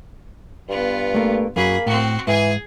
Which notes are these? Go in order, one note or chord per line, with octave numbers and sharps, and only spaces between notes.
G2 B3 F4
A3 A#3
F#2 F#3 A#3 G#4 B5
A2 C4 F#4
G#2 E3 G#4 G#5